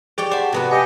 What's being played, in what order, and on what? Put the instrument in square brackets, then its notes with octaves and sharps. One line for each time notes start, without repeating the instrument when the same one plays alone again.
[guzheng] G4 D5 G5 [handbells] G#4
[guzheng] C5 A5 [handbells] D5 F#5
[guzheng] C3 B3 B4 [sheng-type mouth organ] F#4
[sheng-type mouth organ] G4 D#5 [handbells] G#5 G6 C#7